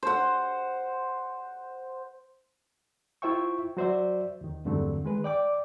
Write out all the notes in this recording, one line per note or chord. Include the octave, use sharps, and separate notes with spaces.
C5 F#5
E4 F4 C5 E5 G5 C#6
F#3 F#4 C5 D5 E5
D#2 D#3
E2 G2 D3 F#3 A3 C4
D#3 G#3 B4
D5 G5 D6